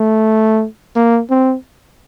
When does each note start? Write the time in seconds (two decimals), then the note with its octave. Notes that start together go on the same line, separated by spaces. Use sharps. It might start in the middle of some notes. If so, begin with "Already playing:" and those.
Already playing: A3
0.96 A#3
1.30 C4